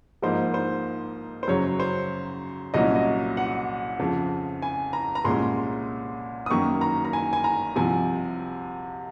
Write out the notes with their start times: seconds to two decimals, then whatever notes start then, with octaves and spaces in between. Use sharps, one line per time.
0.22 G#2 F3 A#3 D#4 C5
0.54 C5
1.43 C5
1.48 F#2 C#3 F#3 C#5
1.80 C5
2.74 C2 A#2 F#3 C#4 D#5
2.95 D#5
3.37 F#5
3.99 F2 C#3 F3
4.62 G#5
4.93 A#5
5.15 A#5
5.25 C2 A#2 G#3 C#4 C6
6.46 D#6
6.50 F#2 D#3 A#3 C#6
6.81 A#5
7.05 A#5
7.13 G#5
7.33 G#5
7.44 A#5
7.76 C2 C3 F3 G#5